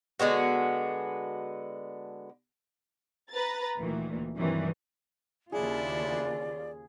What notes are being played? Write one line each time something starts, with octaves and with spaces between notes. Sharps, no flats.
D3 G#3 B3 F#4
B4 A#5 A6
D2 A#2 D#3 E3
G2 C3 D#3 E3 F#3
D#2 C#3 D4 E4 F4 G#4 D5